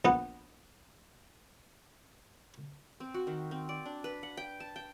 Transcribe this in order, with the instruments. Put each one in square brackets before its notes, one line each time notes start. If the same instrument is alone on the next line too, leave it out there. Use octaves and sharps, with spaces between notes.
[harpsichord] A#1 B3 F#5
[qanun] C4
F#4
D#3
C4
D5
D4
B4
F#5
G5
A5
G5